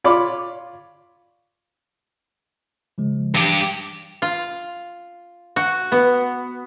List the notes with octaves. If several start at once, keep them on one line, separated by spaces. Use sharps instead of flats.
F4 C#5 D5 B5 D6
C#3 F3 G#3
G2 E3 G4
F4
F#4
B3